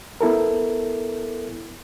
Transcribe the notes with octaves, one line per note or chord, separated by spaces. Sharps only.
B3 E4 A4 A#4